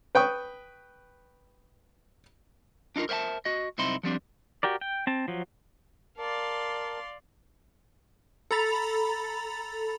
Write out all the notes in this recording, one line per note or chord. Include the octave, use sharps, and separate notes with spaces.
B4 G5 C#6 D#6
D4 D#4 F4 A#4
A#4 C5 E5 F#5 A5
F#4 D#5
C2 F#2 C4 D#4 E4 C6
F3 G3 C4 D4
F#4 G4 A#4 D5
G5
C4 A5
F3 F#3
A#4 D5 F5 A5 C6
A4 A#5 B5 A6 F7